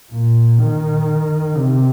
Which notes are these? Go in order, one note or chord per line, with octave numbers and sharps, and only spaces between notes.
A#2
D#3
C3